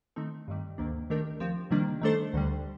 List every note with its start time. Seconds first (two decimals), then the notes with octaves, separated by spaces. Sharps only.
0.16 D#3 A3 C4 D#4
0.48 G2 D#3 G3
0.78 D2 C3 D#3 A#3 D4
1.10 D#3 A3 D4 G4 A#4
1.40 F3 C4 G4
1.71 C3 D#3 G3 A#3 D4
2.01 D#3 A3 D4 A4 C5
2.34 D2 D3 G3